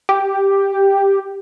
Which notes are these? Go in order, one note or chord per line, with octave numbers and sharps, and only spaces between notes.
G4